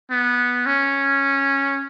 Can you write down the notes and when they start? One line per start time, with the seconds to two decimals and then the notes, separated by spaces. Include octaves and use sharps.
0.11 B3
0.66 C#4